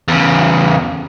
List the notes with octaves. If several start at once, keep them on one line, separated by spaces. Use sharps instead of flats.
E2 C#3